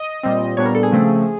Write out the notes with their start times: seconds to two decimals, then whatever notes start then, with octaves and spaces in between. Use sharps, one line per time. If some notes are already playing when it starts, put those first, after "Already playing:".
Already playing: D#5
0.23 A#2 G3 C4
0.57 A#2 G3 B3 D4 C#5
0.65 A#4
0.75 A4
0.83 G#4
0.91 C#3 F3 A3 C4